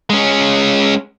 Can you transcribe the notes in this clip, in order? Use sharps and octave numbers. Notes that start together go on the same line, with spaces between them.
G#3 C#4